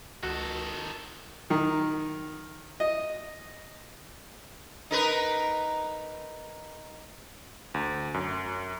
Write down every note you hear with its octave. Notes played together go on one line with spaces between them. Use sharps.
C#2 D#3 F#4 A4
D#3
D#5
D#4 A#4 B4
D2
F#2